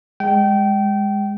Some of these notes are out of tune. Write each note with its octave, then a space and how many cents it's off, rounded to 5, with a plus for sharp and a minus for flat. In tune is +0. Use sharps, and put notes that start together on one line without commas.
G#3 -20 G5 -25